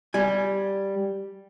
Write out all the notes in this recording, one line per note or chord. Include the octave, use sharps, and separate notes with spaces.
G3 G#5